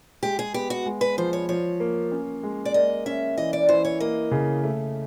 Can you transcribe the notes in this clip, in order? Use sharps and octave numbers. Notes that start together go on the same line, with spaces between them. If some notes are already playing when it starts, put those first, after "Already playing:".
G#3 G4
G#4
B3 G4
F#4
G#3
B4
F3 C5
C#5
F3 C#5
A#3
C#4
G#3
D5
A#3 D#5
C#4 E5
E3 D#5
D5
E3 C5
C#5
A#3 D#5
C#3
A3